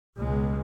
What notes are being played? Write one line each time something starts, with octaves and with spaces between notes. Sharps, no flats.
C#2 B2 G#3